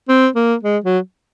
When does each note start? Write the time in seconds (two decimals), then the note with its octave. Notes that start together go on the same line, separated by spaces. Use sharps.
0.09 C4
0.36 A#3
0.63 G#3
0.84 F#3